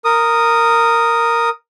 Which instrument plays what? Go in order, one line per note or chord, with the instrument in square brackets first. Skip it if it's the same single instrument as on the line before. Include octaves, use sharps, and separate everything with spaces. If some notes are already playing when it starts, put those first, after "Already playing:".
[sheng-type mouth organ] A#4 D#6